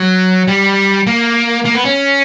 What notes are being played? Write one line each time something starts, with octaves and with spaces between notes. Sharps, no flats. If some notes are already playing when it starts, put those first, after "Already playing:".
Already playing: F#3
G3
A#3
A#3
B3
C#4